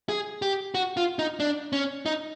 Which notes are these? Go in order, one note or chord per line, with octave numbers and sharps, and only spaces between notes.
G#4
G4
F#4
F4
D#4
D4
C#4
D#4